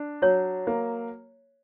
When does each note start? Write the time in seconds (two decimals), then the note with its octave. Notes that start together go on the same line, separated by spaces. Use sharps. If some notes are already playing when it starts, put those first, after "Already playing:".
Already playing: D4
0.22 F#3 C#5
0.67 A#3